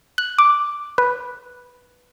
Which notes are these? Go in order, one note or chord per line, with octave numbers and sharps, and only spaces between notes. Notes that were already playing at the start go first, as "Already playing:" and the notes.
F#6
D6
B4